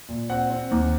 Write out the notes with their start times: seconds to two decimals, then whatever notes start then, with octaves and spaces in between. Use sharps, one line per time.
0.08 A#2
0.30 C4 F#5
0.50 C4
0.71 D#2